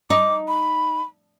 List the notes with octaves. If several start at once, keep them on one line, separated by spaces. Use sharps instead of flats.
D#4 D6
B5